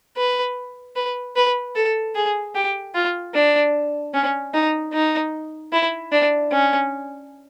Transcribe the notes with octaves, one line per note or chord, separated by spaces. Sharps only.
B4
B4
B4
A4
G#4
G4
F4
D4
C#4
D#4
D#4
E4
D4
C#4